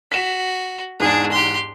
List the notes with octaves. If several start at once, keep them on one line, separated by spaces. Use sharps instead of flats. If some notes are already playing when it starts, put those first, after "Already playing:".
F#4 B6 E7
E2 G#2 D4 G#4
G4 C6